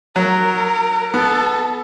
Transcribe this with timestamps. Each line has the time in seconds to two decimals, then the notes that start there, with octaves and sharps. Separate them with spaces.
0.16 F#3 A#4
1.14 B3 A4